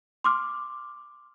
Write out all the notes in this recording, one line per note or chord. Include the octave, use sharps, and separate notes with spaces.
C6 D6 F6